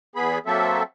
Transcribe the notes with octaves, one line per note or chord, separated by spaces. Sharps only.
E2 B3 G#4 B5
F#3 A#3 C4 A4 E5